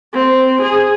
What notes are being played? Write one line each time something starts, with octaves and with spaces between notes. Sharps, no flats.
C4
G#4